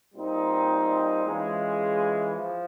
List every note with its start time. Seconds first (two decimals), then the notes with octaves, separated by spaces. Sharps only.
0.14 A#2 G3 C4 D#4
1.25 E3 G#3 C#4 F4 G#4
2.36 F3